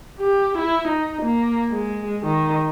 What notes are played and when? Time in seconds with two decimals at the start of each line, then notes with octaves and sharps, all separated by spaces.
0.19 G4
0.58 E4
0.88 D#4
1.22 A#3
1.71 G#3
2.23 D#3